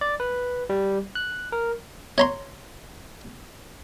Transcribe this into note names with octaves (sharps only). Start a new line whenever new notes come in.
D5
B4
G3
F#6
A#4
C#5 A#5 C6